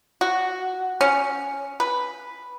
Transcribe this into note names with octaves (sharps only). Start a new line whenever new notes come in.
F#4
C#4
B4